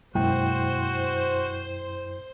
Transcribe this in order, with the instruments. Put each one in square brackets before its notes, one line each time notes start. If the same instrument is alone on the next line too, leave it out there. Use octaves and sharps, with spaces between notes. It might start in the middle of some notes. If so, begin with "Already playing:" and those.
[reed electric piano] F#2 E4 G5 [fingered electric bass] B2 G#3 A#3 [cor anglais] F#4 [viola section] C5